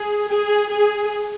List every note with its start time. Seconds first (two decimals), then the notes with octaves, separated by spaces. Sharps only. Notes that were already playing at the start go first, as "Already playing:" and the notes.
Already playing: G#4
0.30 G#4
0.72 G#4